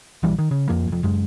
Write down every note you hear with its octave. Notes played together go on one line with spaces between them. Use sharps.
A#1 E3 G3
D#3
C#3
F2 F3 A#3
F1 F2
F#1 F#2 G#3